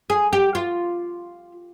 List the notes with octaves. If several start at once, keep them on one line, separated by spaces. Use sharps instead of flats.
G#4
G4
F4